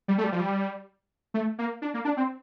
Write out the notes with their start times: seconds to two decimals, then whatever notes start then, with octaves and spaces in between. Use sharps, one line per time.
0.08 G3
0.18 A3
0.24 G3
0.32 F3
0.40 G3
1.34 A3
1.58 A#3
1.82 D4
1.94 A#3
2.05 D4
2.17 C4